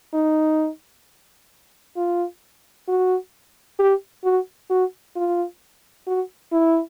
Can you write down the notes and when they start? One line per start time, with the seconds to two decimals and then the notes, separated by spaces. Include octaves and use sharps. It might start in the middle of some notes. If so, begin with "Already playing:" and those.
0.14 D#4
1.97 F4
2.88 F#4
3.79 G4
4.24 F#4
4.70 F#4
5.16 F4
6.07 F#4
6.52 E4